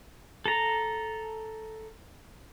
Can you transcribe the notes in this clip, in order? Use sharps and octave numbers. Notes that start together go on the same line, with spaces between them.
A4 A#5